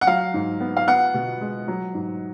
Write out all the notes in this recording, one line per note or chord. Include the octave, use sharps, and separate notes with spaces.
F#5
F#3 F5
G#2
B3
F5
B3 F#5
B2
G#3
F#3
G#2